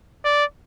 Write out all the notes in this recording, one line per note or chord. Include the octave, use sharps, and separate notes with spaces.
D5